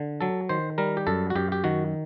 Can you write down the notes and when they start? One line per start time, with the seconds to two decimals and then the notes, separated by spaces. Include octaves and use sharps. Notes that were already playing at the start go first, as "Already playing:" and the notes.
Already playing: D3
0.21 F#3 A4
0.49 D#3 C5
0.78 G3 A#4
0.97 G4
1.07 F#2 A4
1.30 F#4
1.35 F#2 G4
1.52 G4
1.64 D#3 F#4